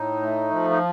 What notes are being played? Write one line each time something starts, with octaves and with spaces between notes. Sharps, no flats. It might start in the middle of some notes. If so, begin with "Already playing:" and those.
Already playing: A2 D#4
A3
F3
D#4